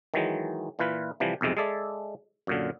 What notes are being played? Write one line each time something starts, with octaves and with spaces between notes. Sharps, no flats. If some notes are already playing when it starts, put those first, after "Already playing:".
D#3 E3 F#3 G#3
A#2 E3 F4 B4
C3 E3 F3 G3
B1 F2 C3 G#3
G#3 G#4 A4 D5 E5
F#2 A#2 D3